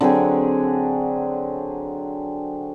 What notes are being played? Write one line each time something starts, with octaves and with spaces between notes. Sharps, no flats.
D3 F#3 C4 G#4